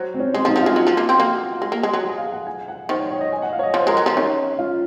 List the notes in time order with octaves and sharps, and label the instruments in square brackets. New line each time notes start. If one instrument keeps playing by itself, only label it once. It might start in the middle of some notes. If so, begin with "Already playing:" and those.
Already playing: [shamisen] F#3 [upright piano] C5
[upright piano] C4
C#4
[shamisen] G#3 [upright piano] C#4
[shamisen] F3
[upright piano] D#4
[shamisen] F3 [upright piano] F#4
[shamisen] G#3 [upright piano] F4
[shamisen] F#3
F3
A#3
C4
[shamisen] A#3 [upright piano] F#4
[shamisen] G#3
A#3
G#3
F#3
[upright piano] G#4
F5
F#5
G#5
F#5
[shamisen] D#3 [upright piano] C5
[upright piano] C#5
C#5
D#5
G#5
F#5
F5
C#5
D#5
[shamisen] F3
[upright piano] C5
[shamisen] G#3 [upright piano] A#4
[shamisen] F#3
F3
[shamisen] D#3 [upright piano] C#4
[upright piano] F4